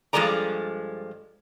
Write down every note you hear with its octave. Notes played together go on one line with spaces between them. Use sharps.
G2 F3 G#3 A4 D5 A#5